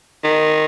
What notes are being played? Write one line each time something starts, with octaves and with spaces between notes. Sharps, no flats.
D#3